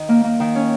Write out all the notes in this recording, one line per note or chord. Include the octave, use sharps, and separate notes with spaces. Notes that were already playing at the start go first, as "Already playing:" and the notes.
Already playing: D#3 D#4
A#3
A#3
D#3
C#4